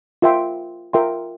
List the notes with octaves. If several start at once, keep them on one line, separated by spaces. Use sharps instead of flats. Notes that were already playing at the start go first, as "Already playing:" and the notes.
F4 A#4 E5 G5 C6
F4 A#4 E5 G5 C6